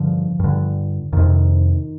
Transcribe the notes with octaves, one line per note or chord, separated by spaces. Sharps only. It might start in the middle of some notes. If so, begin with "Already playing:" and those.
Already playing: G2 D3 F3
G2 D3
F2 C3 D#3